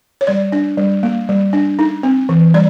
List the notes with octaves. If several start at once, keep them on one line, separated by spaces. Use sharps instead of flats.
C#5
G3 D5
D4
G3
A#3
G3
D4
D#4
C4
E3
G3 D5